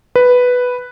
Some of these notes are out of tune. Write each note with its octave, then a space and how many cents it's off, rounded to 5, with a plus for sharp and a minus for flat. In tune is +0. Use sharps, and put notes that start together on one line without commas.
B4 +0